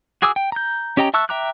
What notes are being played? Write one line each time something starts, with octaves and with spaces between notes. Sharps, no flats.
F#4 G#4 G#5 D6 E6
G5
A#5 G6
C#4 G4 D#5 G5 A#5
E5 A5 C#6 E6 F#6
E5 G5 A#5 D6 F#6